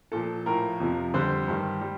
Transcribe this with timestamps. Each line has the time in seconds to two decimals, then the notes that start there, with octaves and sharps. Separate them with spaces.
0.12 A#2 F3 A4
0.46 A2 F3 A#4
0.80 F2 C3 F3
1.14 F2 D3 G3 C5
1.48 G2 D#3 G3
1.81 G3